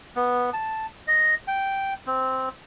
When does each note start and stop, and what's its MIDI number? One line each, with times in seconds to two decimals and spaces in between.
0.16 0.50 59
0.53 0.86 81
1.07 1.35 75
1.48 1.94 79
2.07 2.49 60